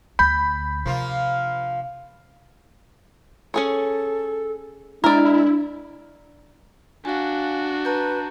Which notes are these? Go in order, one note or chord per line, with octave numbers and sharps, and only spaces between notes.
D2 A3 B5 G6
C3 F3 A#3 D4 F4
C#4 G#4 A4 C#5
G#3 D4 E4 A#4 D5
D4 F#4 F5 G#5
B4 A5 A#5 G6